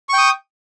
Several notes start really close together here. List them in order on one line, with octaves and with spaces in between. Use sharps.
C#6 G5 D#6